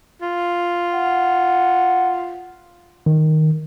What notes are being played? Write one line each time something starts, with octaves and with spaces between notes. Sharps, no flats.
F4
F#5
D#3